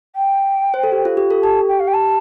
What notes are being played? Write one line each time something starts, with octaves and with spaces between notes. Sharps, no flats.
G5
C5
A4
G4
F4
G4
A4
G4 A5
G5
F5
G5
A5